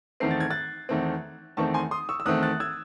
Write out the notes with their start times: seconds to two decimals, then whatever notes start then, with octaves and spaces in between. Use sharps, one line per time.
0.20 E2 D#3 A3 C4 C7
0.31 A6
0.40 G#6
0.51 F#6 A6
0.89 E2 D#3 A3 C4
1.57 E2 D#3 A3 C4 A5 C#6
1.74 G#5 C6
1.91 C6 D#6
2.09 C#6 E6
2.20 E6
2.26 E2 D#3 A3 C4 D#6 F#6
2.43 F#6 A6
2.60 E6 G#6